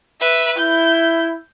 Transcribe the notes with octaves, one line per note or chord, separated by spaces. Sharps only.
B4 E5
E4 G6